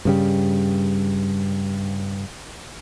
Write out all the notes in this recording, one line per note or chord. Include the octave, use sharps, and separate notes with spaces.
G2 C#3 G3